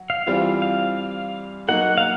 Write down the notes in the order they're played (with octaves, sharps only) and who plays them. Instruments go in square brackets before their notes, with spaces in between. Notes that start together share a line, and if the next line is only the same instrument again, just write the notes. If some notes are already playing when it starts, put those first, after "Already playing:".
Already playing: [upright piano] F#3
[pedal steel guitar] F5
[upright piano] E3 G3 C4 F4 [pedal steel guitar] F5
[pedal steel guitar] F5
[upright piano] F#3 A#3 D#4 F#4 [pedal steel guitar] F#5
[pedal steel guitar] F5